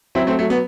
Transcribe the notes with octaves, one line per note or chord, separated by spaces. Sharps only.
F#3 C4 E4
A3 C4
F#3 A3
B3